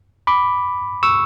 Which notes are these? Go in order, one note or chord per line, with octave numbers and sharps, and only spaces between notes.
B5 D6
C#6 E6